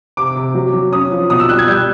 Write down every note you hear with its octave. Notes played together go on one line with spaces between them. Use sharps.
C3 D6
C3
F#3
F#3
C#4 D#6
F3
B2 D#6
E6
G3 F#6
G#6
G3 G6